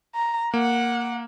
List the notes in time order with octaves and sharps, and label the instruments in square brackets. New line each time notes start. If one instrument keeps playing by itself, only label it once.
[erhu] A#5
[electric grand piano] A#3 [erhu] F#5